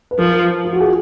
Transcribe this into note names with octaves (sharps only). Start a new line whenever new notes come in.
B4
F3 A#4
F4
F#4
G#4